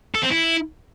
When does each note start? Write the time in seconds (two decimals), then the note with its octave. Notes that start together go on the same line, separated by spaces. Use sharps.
0.15 A4
0.23 C4
0.31 E4